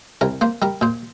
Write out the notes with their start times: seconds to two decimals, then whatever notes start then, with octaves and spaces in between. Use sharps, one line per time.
0.21 C2 A#4
0.41 A#3 C5
0.62 G3 A#4
0.81 A#2 C5